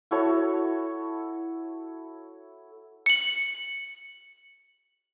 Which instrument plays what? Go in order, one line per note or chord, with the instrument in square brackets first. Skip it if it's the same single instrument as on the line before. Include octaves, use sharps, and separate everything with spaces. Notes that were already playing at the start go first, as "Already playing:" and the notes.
[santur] E4 F#4 A4 C#5
[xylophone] C#7 F#7